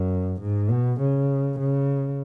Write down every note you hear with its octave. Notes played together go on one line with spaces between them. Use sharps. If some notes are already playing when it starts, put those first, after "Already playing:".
Already playing: F#2
G#2
B2
C#3
C#3